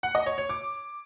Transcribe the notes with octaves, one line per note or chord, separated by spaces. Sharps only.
F#5
D#5
C#5
C#5
D6